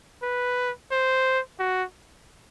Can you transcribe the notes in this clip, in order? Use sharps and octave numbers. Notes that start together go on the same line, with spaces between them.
B4
C5
F#4